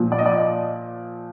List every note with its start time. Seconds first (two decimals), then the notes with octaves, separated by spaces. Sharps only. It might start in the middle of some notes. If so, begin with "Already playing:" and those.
Already playing: A#2 F3
0.12 D5
0.18 D#5
0.26 D5